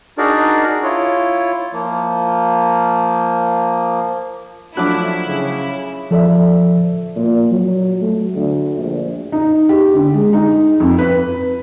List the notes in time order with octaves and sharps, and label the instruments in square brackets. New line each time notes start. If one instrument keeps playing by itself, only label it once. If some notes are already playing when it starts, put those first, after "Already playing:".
[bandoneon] D4 D#4 F#4 G#4 A#4 D5
E4 F4 C#5
F3 A#3
[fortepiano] F3 F#3 D4 [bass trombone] A3 [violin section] E4 [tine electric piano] D6 F#6
[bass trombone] C#3
[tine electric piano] F3 A4 D5 E5
[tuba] A#2
F#3
A3
D2
A#1
[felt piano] D#4
G4
D3
G#3
D#4
F2
B4